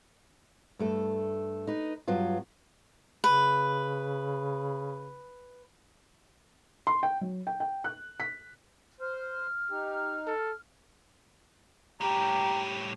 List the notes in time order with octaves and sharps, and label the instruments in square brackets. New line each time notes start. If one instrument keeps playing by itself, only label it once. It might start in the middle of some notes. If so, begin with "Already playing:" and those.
[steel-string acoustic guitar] G2 A3 A4
D#4 B4
G2 F#3 B3 F4
[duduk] C#3 [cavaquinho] B4
[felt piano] C6
G5
F#3
G5
G5
F#6
B6
[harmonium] C5 [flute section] F6
[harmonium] D#4 [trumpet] G4
[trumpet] A4
[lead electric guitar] A2 G3 [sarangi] G4 [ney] A#5